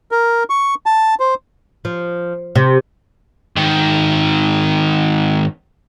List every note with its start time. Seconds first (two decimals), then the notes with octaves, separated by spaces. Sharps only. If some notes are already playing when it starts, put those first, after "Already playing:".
0.11 A#4
0.50 C#6
0.86 A5
1.20 C5
1.85 F3
2.56 C3
3.56 G#2 D#3